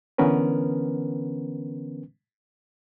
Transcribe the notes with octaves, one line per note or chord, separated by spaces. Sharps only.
D3 E3 B3 C#4 A#4 B4